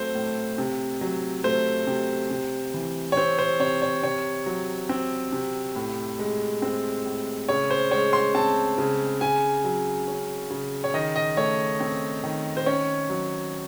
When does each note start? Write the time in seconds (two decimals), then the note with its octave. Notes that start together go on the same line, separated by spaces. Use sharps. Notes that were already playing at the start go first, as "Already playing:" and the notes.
Already playing: F#3 A3 C4 C5
0.15 A2
0.58 C3
1.01 F#3
1.44 A3 C5
1.87 C3
2.31 C3
2.74 E3
3.12 C#5
3.17 C4 C5
3.39 C5
3.60 C3 C#5
3.82 C#5
4.03 C3 C#5
4.46 F#3
4.89 C4
5.33 C3
5.76 A2
6.19 G#3
6.62 C4
7.05 A2
7.48 C#3 C#5
7.71 C5
7.91 G#3 C#5
8.13 C6
8.35 C4 A5
8.78 C#3
9.21 C#3 G#5
9.64 F#3
10.07 C#4
10.50 C#3
10.84 C#5
10.94 D#3 D#5
11.16 D#5
11.37 A3 C#5
11.80 C4
12.23 D#3
12.57 C5
12.66 C#4 C#5
13.10 F#3